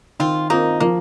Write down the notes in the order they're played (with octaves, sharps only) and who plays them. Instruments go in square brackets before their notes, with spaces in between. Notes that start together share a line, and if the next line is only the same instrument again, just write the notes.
[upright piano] D#3 [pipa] C4 F4
[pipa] A#3 D#4 [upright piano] C4 F4 A#4
[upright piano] F3 [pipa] A#3